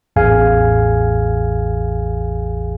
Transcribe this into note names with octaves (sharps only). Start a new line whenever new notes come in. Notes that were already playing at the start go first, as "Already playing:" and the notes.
A1 E2 G#4 F5 G#5